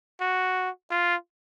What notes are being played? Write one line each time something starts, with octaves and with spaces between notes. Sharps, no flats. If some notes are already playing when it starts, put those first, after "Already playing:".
F#4
F4